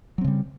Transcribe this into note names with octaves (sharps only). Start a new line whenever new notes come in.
C#3 F#3 G3 C4